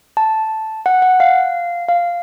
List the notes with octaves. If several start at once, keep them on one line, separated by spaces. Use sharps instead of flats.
A5
F#5
F#5
F5
F5